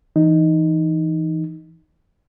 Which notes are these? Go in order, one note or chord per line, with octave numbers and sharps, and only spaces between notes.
E3 D#4